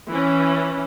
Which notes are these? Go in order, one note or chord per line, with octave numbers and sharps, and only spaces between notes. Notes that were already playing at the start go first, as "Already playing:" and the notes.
E3 C#4